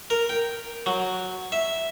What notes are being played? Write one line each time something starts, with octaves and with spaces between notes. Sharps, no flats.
A#4
G5
F#3
E5